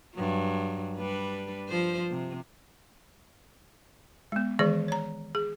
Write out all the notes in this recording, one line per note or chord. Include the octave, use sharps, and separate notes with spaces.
G2 F#3
G3 D4 B4
F3 C5
C3
G#3 B3
D#3 E3 G#3 G#4 D5
C#5 A#5
G#4